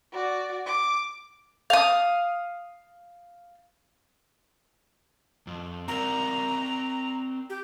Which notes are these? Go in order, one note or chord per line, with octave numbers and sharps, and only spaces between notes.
F#4 D5
D6
F5 D#6
F2
C4 A#4 D5 A#5
G4